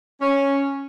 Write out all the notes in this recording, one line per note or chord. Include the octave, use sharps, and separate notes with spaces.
C#4